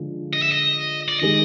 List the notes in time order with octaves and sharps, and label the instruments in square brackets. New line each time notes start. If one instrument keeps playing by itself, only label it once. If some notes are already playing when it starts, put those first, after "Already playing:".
Already playing: [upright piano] D3 F3 G#3
[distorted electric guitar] D#5
E5
D#5
D5
[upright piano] D#3 G#3 [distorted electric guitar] D#5